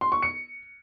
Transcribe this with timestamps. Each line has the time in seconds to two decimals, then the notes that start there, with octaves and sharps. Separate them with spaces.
0.01 C6
0.12 C#6
0.22 C#7